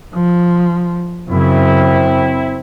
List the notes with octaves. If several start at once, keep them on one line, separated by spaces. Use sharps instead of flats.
F3
F#2 C#3 C4 E4